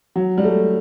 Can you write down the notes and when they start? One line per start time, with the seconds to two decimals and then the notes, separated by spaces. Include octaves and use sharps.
0.16 F#3
0.38 G3
0.44 A3